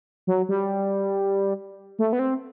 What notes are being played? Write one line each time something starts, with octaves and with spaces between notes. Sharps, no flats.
F#3
G3
A3
B3
C4